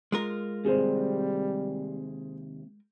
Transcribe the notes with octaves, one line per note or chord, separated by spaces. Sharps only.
G#3 F4 A#4
D#2 C3 G3 G#4 C5